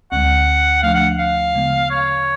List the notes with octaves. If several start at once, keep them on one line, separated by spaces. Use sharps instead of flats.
D2 D3 G#3 F#5
D3 F3 A3 D4 F5
F#5
F5
C#3 G#3 B3
C#5